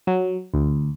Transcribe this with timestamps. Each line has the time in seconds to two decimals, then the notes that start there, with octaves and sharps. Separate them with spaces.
0.07 F#3
0.54 D2